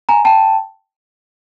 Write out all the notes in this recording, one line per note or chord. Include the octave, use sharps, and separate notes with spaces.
G#5 A#5
G5 A5